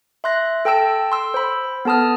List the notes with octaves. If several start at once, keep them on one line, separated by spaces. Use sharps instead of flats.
E5 C6 F#6 A#6
A4 G5 A5 E6 D7
C6 E6
C5 B5
B3 A4 A5 D#6 F6